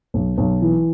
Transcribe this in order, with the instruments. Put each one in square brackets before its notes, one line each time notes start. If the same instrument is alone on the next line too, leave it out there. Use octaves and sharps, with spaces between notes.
[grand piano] B1
B1
E3